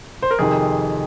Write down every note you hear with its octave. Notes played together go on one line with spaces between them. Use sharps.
C5
A#4
F2 C3 D#3 G#4